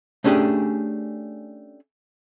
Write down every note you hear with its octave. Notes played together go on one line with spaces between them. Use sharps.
A3 C#4 D4 G4 G#4